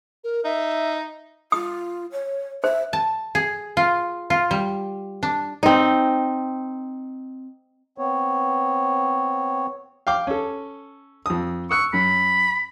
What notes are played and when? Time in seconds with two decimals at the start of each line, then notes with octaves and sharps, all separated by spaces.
0.24 A#4
0.45 D#4 E5
1.52 F4 D#6
2.12 C#5
2.64 C5 E5
2.93 A5
3.35 G#4
3.77 F4
4.30 F4
4.51 G3
5.23 D4
5.63 C4 D#4
7.98 B3 C4 C#5
10.07 F5 G5 D6
10.27 C#4 A4
11.26 F2 D#6
11.71 C#6 D#6 E6 F#6
11.93 F#2 B5